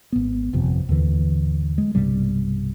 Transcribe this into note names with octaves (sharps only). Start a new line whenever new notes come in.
G#1 B3
G1 F2 C3 F3
D#2 G#2 D3 E3
G#3
B1 G2 C3 G3